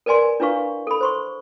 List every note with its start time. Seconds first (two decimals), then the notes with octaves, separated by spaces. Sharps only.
0.06 A#4 B4 D5 G#5 C6
0.40 D4 E4 B4 F5 C#6
0.87 A4 B5
1.01 C5 C6 C#6